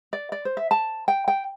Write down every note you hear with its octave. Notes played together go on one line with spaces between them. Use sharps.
D5
D5
C5
E5
A5
G5
G5